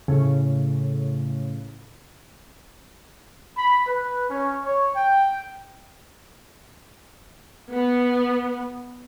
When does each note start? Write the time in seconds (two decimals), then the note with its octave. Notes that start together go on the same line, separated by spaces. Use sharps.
0.08 A2 C#3
3.56 B5
3.87 B4
4.31 C#4
4.64 C#5
4.96 G5
7.71 B3